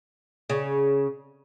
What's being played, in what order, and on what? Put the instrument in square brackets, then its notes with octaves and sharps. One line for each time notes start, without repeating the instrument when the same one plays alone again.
[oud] C#3